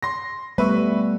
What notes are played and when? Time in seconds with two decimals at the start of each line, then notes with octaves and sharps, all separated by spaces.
0.03 C6 A#6
0.58 G3 A3 B3 B4 E5 C#6